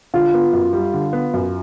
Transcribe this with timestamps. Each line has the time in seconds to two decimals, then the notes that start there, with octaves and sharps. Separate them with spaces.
0.14 D3 F4
0.34 B3
0.53 F#2
0.73 G3
0.94 D3
1.13 B3
1.34 F#2